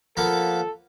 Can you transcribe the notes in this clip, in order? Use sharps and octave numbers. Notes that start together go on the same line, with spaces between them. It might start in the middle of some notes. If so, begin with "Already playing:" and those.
F3 A#3 B3 A4